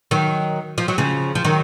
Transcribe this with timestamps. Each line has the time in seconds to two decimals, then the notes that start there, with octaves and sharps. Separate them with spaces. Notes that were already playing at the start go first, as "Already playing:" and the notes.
0.11 D#3 F#3
0.78 F3
0.88 F#3
0.98 C#3 F3
1.35 F3
1.44 D#3 F#3